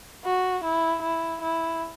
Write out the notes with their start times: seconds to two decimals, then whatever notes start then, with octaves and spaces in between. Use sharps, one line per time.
0.24 F#4
0.64 E4
1.02 E4
1.41 E4